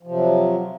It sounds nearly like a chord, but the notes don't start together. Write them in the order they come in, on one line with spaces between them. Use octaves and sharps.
F3 C3 F#3